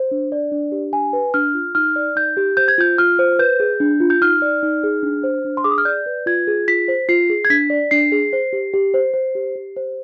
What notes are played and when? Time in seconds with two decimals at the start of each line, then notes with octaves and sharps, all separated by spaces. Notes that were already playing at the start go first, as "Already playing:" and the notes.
Already playing: C5
0.11 D4
0.32 D5
0.52 D4
0.72 G4
0.92 D4 G#5
1.13 B4
1.34 D4 F6
1.54 F4
1.75 D#4 F6
1.96 D5
2.16 D#4 G6
2.37 G4
2.57 C5 G6
2.68 G#6
2.78 F4 G6
2.98 F4 F6
3.19 C5
3.39 B4 G6
3.60 G#4
3.80 D4
4.00 F4
4.10 G6
4.21 D#4 F6
4.42 D5
4.63 D#4
4.84 G#4
5.03 D4
5.24 C5
5.45 D4
5.57 C6
5.64 G#4 D6
5.71 D#6
5.78 F6
5.85 D5 G6
6.06 B4
6.26 F4 G#6
6.47 G#4
6.68 F4 B6
6.88 C5
7.08 F4 C7
7.30 G#4
7.45 G#6
7.50 D4 B6
7.70 D5
7.91 D4 C7
8.12 G#4
8.33 C5
8.53 G4
8.73 G4
8.94 C5
9.14 C5
9.35 G4
9.56 G4
9.76 C5